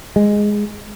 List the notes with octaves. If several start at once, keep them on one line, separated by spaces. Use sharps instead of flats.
G#3